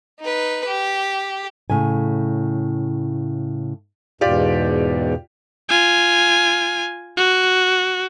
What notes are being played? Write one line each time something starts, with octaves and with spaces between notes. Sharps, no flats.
D#4 B4
G4
A2 C#3 G#5
E2 G#2 B2 F4 G4 D5
F4 G#5
F#4